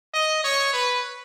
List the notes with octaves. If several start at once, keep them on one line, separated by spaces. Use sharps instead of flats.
D#5
C#5
B4